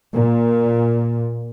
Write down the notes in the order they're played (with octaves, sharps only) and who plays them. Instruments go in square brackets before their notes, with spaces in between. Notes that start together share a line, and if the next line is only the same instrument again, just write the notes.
[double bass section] A#2